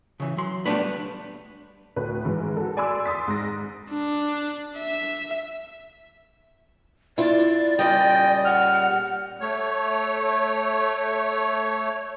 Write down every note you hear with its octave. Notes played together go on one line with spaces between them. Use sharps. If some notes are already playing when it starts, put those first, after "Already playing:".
C#3 E3
F#3 C6
G3 A3 B3 C#4 D4 B4
D2 A2 B4
G#2 E3
F#4 A4
D5 G#5 B5 C6 D6 E6
C6 D#6 A6 B6
G#2 A#6
D4
E5
E4 F4 D5
A#2 C#3 G3 D#5 G5
F#5 F6
A3 C#5